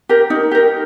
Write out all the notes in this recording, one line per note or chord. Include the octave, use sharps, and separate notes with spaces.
G4 A#4
D#4
G4 A#4